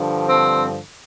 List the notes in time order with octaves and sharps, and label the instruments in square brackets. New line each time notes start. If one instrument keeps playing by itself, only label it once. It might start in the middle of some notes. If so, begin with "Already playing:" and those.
Already playing: [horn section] G2 D3 F3
C4